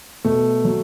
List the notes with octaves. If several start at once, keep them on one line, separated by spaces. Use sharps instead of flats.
B2 A3
F#3